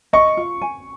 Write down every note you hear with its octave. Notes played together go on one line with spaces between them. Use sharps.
D#5 C#6
F4
G#5